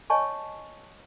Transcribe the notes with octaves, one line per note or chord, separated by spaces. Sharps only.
C#5 D#5 G#5 A5 C#6